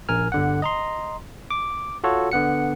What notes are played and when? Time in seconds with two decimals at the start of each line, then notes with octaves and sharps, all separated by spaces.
0.09 A#1 A#4 G#5 F6
0.32 G1 D3 F#5
0.62 D#5 A#5 C6
1.51 D6
2.04 F4 F#4 A4 C#5
2.32 D3 B3 F#5 C#7